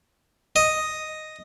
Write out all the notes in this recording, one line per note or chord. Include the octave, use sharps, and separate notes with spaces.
D#5